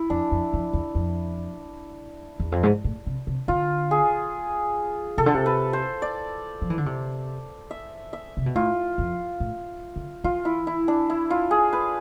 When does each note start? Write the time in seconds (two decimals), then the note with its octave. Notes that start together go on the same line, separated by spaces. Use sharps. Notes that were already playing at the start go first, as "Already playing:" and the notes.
Already playing: E4
0.10 F2 D4
0.31 F2
0.53 F2
0.73 E2
0.95 F2
2.40 E2
2.52 F2
2.63 G#2
2.84 A2
3.07 C3
3.27 C3
3.48 D3 F4
3.91 G#4
5.18 C3 A4
5.26 D3
5.34 C3
5.46 B4
5.73 C5
6.02 D5
6.62 F3
6.70 E3
6.78 D3
6.86 C3
7.71 E5
8.13 E5
8.37 C3
8.46 B2
8.55 A2 F4
8.98 F2
9.40 A2
9.96 D3
10.24 E3 F4
10.45 E4
10.67 E4
10.88 D4
11.10 E4
11.30 F4
11.51 G#4
11.73 B4